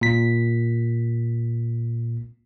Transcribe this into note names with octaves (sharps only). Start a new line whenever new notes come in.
A#2 B6